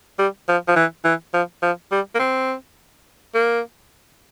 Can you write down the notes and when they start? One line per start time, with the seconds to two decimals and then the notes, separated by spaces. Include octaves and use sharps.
0.19 G3
0.48 F3
0.68 F3
0.76 E3
1.05 E3
1.34 F3
1.62 F3
1.92 G3
2.15 A#3
2.19 C4
3.34 A#3